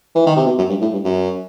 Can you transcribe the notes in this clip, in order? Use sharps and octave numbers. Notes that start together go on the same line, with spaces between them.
E3
D#3
C3
B2
F#2
G2
A2
G2
F#2